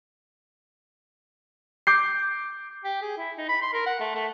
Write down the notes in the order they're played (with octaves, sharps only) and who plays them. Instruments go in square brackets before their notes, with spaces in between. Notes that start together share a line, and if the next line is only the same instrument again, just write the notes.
[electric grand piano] D6 G6 C7
[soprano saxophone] G4
G#4
E4
D#4
B5
C6
A#4
F#5
A3
A3